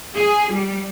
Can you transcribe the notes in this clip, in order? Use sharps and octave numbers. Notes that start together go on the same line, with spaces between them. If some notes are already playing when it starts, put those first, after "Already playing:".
G#4
G3